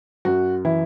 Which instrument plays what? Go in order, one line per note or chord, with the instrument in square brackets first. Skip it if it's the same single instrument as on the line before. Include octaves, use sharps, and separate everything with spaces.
[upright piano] F#2 F#4
E3 E4